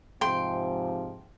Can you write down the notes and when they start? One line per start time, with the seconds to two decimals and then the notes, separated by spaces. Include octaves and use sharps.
0.21 G#2 C3 F3 G5 C6